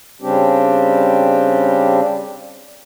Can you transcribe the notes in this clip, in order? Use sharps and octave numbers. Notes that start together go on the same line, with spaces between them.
C#3 G3 C4 D4 G4